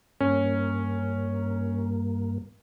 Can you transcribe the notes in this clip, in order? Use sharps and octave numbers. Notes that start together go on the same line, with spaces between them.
G2 A#3 C#4